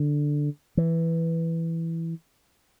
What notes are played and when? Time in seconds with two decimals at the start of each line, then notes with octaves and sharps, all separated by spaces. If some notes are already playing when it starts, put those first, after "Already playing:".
Already playing: D3
0.77 E3